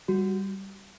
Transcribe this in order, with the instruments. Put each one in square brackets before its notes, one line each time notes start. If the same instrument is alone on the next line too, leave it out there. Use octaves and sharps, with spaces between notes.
[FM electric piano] G3 [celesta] F#4